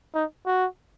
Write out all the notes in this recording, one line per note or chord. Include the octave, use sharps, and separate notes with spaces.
D#4
F#4